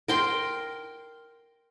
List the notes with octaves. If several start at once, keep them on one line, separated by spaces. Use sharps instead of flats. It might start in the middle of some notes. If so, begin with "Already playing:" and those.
A#4 G5 C6